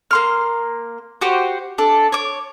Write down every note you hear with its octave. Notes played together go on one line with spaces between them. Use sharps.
A#3 C6 F6
F#4 G4 C5
D4 A4
C#5 D6